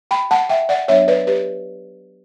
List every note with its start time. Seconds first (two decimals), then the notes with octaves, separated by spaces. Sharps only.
0.11 G5 B5
0.31 F#5 A5
0.49 E5 G5
0.69 D5 F#5
0.88 F#3 B3 D4 C#5 E5
1.08 B4 D5
1.27 G4 B4